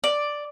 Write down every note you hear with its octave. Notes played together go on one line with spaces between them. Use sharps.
D5